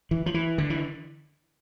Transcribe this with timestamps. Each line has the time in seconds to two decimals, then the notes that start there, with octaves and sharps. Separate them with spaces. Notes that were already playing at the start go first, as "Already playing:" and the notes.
0.11 E3
0.26 F3
0.34 E3
0.58 D3
0.70 E3